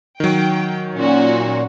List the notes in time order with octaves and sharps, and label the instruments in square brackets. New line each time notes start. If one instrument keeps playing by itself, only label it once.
[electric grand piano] D#3 F#3 [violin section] G5
[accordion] A#2 [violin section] C#4 F#4